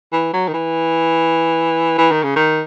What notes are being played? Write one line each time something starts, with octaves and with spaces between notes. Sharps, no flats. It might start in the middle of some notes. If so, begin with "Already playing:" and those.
E3
F#3
D#3
E3
E3
D#3
C#3
D#3